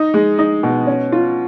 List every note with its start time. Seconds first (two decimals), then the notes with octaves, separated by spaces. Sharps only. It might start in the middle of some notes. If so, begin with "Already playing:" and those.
Already playing: D#4
0.14 G#3
0.39 D#4
0.63 B2
0.87 C#4
1.12 F4